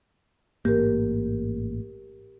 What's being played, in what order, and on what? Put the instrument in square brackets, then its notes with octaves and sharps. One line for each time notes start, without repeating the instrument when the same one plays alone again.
[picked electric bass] A1 G#2 A#3 [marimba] G4 A#4